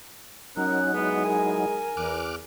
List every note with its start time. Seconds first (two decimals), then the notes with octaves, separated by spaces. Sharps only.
0.57 F#3 C#4 D#4 A#4 F#6
0.94 G#3 B3 E4 G#4
1.25 A#4 G#5
1.97 E2 D6 F6 F#6